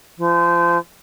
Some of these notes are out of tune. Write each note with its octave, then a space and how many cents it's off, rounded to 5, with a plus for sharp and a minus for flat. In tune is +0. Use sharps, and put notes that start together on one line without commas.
F3 -30